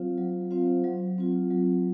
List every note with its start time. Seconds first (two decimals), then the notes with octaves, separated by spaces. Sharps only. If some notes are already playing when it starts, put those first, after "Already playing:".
Already playing: F#3 C4 F4 C5 F5
0.18 F#3
0.51 C4 F4 C5 F5
0.84 F#3
1.18 C4 F4
1.51 F#3